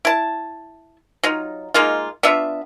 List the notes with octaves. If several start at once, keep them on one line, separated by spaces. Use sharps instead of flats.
E4 A5
F#3 D#4 F4
G#3 A#3 D#4 F4
B3 D4 F4 E5